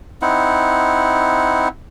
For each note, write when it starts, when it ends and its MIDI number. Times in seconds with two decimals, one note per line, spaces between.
0.22 1.68 60
0.22 1.68 63
0.22 1.68 64
0.22 1.68 78